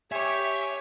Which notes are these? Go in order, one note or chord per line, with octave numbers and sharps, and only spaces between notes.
G4 C#5 E5 G#5